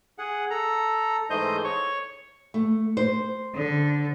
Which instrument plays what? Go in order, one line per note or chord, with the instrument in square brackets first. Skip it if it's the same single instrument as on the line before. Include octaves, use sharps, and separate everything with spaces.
[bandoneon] G#4 F#5
A4 A#5
G#2 E3 A3 C5 D#5 G6
C#5 C#6
[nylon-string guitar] A3
C5
[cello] D3